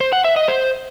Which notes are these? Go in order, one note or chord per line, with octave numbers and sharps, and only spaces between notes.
C5
F#5
E5
D#5
C5